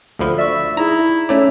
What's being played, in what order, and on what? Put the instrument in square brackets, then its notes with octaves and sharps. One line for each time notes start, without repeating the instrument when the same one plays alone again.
[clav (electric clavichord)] D2 F3 [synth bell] A4 B5 F6
[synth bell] D5 C#6 [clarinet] E5
[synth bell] D#4 G#4 E5 [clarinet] E4 [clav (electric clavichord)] A#5
[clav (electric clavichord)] A3 D5 [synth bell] C#4 C#5 A#5 [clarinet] E5